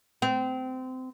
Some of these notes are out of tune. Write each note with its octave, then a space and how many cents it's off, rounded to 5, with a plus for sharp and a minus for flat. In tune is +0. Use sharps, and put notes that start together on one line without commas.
C4 -25